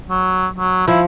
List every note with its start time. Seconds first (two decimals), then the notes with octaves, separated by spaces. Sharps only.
0.10 F#3
0.57 F#3
0.88 F3 E4